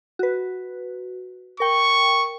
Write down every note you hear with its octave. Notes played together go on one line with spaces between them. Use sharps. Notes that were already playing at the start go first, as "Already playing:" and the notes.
F#4 B4
A#4 G5 C#6